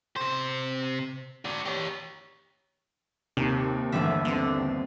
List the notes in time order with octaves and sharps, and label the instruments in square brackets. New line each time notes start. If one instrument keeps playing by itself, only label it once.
[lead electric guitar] C3 C5
F#4 D5
G4 C#5
[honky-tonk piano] D#2 [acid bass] C3
[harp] G1 G3 E5 [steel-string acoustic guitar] D3 E3 A3
[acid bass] D3 [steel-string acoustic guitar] B3 C4